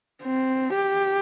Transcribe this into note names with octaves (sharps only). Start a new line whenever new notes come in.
C4
G4